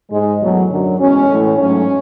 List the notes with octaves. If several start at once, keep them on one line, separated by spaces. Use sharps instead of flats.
G#2 G#3
E2 B2 F#3 A3
F#2 D3 F#3
E2 B2 G#3 C#4
A2 E3 A3
G#2 F#3 A3 C#4